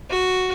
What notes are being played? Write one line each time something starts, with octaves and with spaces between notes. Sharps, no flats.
F#4